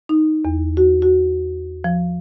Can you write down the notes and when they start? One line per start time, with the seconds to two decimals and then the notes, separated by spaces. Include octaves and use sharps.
0.09 D#4
0.45 E2
0.77 F#4
1.02 F#4
1.84 F3